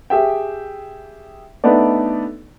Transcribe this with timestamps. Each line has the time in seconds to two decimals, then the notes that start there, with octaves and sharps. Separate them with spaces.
0.10 G4 G#4 E5 G5
1.64 A3 B3 D4 D#4 D5